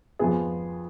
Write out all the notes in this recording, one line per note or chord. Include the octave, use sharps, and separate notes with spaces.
F2 F3 B3 G#4